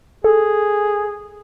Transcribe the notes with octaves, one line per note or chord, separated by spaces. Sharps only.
G#4 A4